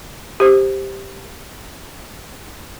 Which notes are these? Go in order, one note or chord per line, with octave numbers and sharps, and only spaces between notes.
G4 C5